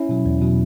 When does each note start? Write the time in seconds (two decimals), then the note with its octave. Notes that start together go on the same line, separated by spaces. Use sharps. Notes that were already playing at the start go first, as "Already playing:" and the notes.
Already playing: C#4 E4
0.09 B2 F#3
0.26 E2
0.42 B2 F#3